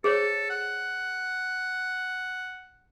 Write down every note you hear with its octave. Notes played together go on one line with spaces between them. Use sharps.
G#4 A4 C5 C#5
F#5